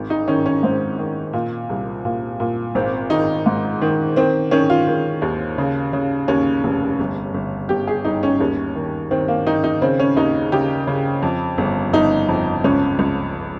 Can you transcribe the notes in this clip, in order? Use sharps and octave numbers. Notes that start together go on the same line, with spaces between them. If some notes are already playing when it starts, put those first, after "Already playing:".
Already playing: G#1
D#4
D#3 C#4
C#4
G#2 C4
D#3
A#2
C2
A#2
A#2
G#1 C4
D#3 D#4
G#2
D#3
D#3 C4
D#3 C#4
F4
D#3
D#2
C#3
C#3
D#2 C#4
F1
G1
G1
G1 G4
G#4
G1 D#4
C#4
D#2
D#3
D#3 C4
A#3
D#3 D#4
D#4
C#3 C4
C#4
D#2 D#4
C#3 G4
C#3
F2
G1
G1 D#4
F2
C#2 C#4
C#2